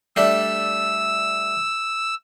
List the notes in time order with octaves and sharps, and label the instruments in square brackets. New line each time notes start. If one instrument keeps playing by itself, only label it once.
[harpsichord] G3 A3 D4 [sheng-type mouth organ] E6